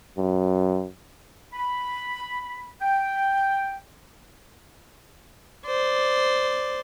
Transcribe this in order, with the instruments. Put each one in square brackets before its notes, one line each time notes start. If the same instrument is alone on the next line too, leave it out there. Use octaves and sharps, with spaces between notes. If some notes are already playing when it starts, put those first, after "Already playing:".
[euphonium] F#2
[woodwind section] B5
G5
[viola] C5 D5